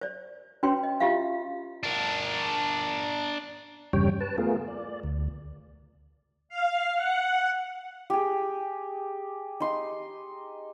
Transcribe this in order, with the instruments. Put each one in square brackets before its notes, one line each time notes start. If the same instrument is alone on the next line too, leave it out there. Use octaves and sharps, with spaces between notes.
[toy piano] C5 D5
C#4 F#4 B4 C#5 G5 C6
D#5
E4 F4 G4 E5 F5
[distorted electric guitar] D4 A#4
[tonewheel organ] E2 G2 C#3 G3 C#5 G5
B4 A5
A3 B3 F4 G#4 A#4
D5
D2
[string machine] F5
F#5
[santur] G4 G#4
D#4 C6